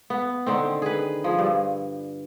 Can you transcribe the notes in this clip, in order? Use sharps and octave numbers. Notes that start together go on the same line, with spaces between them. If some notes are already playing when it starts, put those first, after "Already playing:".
B3
D3 D#3 C4
G#4 B4
F3 G#4
G2